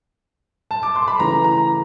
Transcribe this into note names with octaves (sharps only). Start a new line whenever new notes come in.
A5
D6
C6
B5
C#3 E3 A3 A#5
A#5